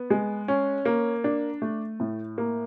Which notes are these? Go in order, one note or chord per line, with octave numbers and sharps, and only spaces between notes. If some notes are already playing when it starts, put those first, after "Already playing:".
Already playing: B3
G#3
C#4
A#3
D4
A3
A2
A#3